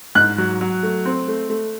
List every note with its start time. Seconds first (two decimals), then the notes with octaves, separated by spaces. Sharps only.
0.15 G#2 F#6
0.38 F#3
0.61 F#3
0.83 A3
1.05 C4
1.28 A3
1.50 A3